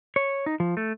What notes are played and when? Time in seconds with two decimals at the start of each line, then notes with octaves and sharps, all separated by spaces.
0.16 C#5
0.46 D#4
0.60 F3
0.77 A3